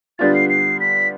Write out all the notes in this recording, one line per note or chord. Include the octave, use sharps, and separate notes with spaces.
D3 G3 B3 D4 F4 A6
C7
C7
B6